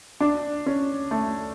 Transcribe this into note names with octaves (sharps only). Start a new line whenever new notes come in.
D4
C#4
A3